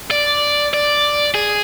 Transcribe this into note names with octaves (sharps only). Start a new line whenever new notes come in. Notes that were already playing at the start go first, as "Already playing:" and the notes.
D5
D5
G#4